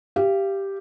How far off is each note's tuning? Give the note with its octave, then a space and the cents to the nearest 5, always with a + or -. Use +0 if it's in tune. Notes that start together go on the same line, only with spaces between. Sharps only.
G4 +0 F5 -30